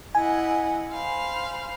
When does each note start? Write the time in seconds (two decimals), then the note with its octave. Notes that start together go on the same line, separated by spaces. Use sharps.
0.15 E4 D#5 F#5 G#5
0.91 C5 F5 B5